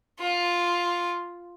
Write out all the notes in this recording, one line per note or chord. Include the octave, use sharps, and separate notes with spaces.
F4